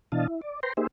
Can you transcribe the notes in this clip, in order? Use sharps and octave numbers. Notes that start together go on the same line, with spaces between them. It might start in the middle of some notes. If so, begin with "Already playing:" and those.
B2 E3 D4 D#5 F5 A5
E4
D5
B4 C5 G5 A#5 C6
A#3 D#4 G4 G#4 C5 E5